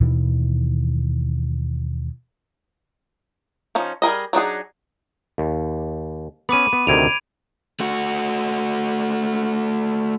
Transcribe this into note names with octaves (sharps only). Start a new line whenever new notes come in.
D#2 B2 D#3 E3
F3 C#4 D#4
G3 G#4 A#4 D#5
F#3 D4 D#4 G#4
D#2
B3 C#4 B5 D6 D#7
B3
D2 C3 D#3 G#6 D7 F7
A3 F#4